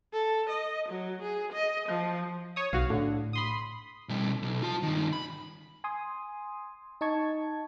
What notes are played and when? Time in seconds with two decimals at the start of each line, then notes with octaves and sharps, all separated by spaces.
0.13 A4
0.50 D#5
0.89 F#3
1.22 G#4
1.53 D#5
1.89 F3
2.56 C#5 D#6
2.73 B1 F#4 F5
2.90 A2 D3
3.33 B5 C6 D#6
4.09 B2 G3
4.43 B1
4.62 F4 A5
4.83 G2 D#3
5.13 B5
5.84 G#5 C6 D#6
7.01 D#4 D#5 A5 C#6 G#6